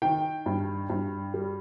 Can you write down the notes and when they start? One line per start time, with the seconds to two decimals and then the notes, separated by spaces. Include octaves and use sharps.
0.02 D#3 G5
0.46 G2
0.90 G2
1.34 G3